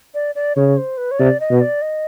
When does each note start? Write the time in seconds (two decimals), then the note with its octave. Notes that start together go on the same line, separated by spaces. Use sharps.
0.14 D5
0.35 D5
0.56 C#3 C#5
0.77 C5
0.97 B4
1.11 C#5
1.19 C3 D5
1.40 D#5
1.51 B2
1.61 D5
1.82 D#5